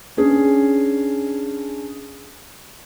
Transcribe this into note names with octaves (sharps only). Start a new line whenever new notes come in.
C#4 D4 G#4